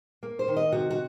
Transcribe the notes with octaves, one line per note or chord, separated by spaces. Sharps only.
A#3
C5
D#3
D#5
C3 F#4
F#4